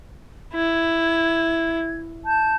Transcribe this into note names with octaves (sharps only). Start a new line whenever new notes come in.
E4 G#6
A5 G6